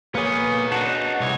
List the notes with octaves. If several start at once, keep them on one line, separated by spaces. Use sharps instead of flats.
A#3 B3 G#4 B4 C#5
D4 D#4 F#4 F#5 A5
C2 C#5